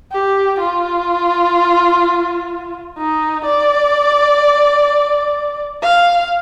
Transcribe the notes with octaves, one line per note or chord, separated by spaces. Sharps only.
G4
F4
D#4
D5
F5